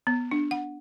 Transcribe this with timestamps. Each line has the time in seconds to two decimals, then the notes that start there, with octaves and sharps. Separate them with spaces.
0.07 B3
0.31 D4
0.51 F#5